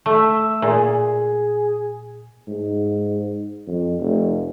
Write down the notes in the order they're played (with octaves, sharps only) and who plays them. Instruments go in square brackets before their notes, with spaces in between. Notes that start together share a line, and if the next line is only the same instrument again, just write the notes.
[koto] A3 [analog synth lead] E5
[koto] A#2 [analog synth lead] G#4
[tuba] G#2
F2
F1